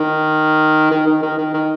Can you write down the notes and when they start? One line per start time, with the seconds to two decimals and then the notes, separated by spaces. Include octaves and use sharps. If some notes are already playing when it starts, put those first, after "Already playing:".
Already playing: D#3
0.91 D#3
1.07 D#3
1.22 D#3
1.38 D#3
1.54 D#3